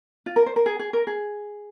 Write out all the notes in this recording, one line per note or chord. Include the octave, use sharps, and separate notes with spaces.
F4
A#4
C5
A#4
G#4
G#4
A#4
G#4